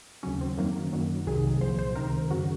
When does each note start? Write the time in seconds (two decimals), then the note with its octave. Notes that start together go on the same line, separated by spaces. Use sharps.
0.23 D#2 C#3 F#3 C#4
0.41 C4
0.57 F#2 D#3 F#3 A#3
0.93 F#2 D#3 F#3
1.27 C2 C3 D#3 F#3 G#4
1.61 C2 A#2 F3 C5
1.79 C5
1.95 C#2 C3 D#3 A#4
2.30 F#2 C#3 F#3 F#4